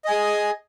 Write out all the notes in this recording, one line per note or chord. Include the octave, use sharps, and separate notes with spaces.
G#4 D#5 G#5